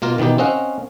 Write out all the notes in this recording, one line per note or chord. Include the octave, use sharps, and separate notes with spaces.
B2 A#3 F4 A#4
B2 D#3 E3 D#4 G4
C4 C#4 D#5 F5 F#5